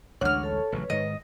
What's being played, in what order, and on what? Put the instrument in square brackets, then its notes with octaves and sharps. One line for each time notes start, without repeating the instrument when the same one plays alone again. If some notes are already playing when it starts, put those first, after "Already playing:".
[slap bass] A1 D2 G#3 [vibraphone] D4 F#5 [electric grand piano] C#5 [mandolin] F6 F#6
[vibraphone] A4 A5
[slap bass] A1 C#3 F#3 [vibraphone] B4
[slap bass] G#2 D#3 [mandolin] D#5